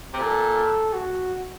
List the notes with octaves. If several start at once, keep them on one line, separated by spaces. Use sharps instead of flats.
C3
A#2 A4
F#4